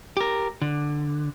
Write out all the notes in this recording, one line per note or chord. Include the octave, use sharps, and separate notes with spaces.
G4 A#4
D3